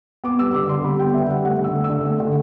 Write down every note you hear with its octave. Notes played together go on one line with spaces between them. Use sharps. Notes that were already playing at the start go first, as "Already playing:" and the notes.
B3 D6
G3 E6
D3 D6
D3 C6
G3 B5
B3 G5
D3 E5
G3 F#5
A3 F#5
D3
E6
A3
E6
D3
A3
D3